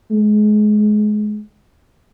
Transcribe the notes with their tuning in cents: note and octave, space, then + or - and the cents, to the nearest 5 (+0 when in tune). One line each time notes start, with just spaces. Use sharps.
G#3 +25